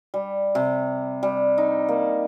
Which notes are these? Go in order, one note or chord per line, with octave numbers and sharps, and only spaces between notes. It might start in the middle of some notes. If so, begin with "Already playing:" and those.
G3
C3
G3
D#4
A#3